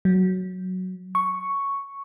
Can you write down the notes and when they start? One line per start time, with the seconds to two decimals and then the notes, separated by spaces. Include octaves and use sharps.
0.05 F#3
1.15 C#6